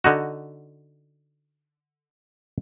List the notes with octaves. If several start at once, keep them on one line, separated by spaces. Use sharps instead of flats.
D3 D#4 F#4